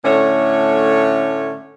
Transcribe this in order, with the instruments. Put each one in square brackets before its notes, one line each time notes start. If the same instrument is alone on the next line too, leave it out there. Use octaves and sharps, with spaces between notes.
[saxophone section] A2 D3 A3 C#4 C#5